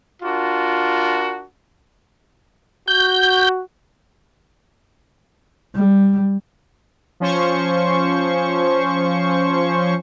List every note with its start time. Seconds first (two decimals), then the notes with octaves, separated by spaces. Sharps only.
0.23 D4 F4 F#4 A#4
2.88 F#4 G6
5.75 G3
7.20 F3 C#4 C5 C#6